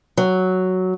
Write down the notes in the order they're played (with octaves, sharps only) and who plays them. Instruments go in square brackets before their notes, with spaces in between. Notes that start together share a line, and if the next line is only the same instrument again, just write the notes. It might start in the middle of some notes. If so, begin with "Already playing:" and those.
[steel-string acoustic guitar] F#3